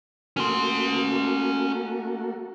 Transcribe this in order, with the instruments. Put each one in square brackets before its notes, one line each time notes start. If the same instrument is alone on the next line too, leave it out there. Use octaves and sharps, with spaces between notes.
[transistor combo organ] A3 A#3 F#4 [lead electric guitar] C#4 C6